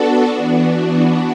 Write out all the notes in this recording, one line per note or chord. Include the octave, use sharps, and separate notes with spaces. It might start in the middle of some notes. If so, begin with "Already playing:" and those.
Already playing: B3 D4 F#4 A4
E3 B3 D4 F#4